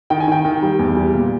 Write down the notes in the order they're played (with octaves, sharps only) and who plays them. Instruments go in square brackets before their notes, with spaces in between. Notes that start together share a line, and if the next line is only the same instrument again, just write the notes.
[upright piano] D#3 G5
G#5
D#3 G5
D#3
G3
E2
G3
A#2